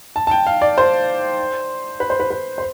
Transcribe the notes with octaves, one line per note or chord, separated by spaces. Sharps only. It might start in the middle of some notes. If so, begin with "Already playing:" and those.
A5
A5
G5
F5
D5
C5
B4
C5
B4
B4
C5